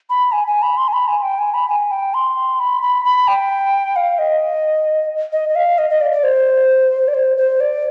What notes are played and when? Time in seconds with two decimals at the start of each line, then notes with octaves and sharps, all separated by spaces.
0.10 B5
0.32 G#5
0.47 G#5
0.62 B5
0.77 C6
0.88 G#5
0.93 B5
1.08 G#5
1.23 G5
1.39 G#5
1.54 B5
1.69 G#5
1.91 G5
2.14 C6
2.60 B5
2.82 B5
3.05 B5
3.28 G5
3.96 F5
4.19 D#5
5.33 D#5
5.49 D#5
5.55 F5
5.78 D#5
5.90 D#5
6.01 D5
6.12 D5
6.24 C5
7.08 D5
7.14 C5
7.37 C5
7.60 D5